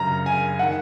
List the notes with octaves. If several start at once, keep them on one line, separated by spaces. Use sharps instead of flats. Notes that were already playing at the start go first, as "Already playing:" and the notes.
Already playing: F#2 C#3 A#5
G#5
D#3 F#5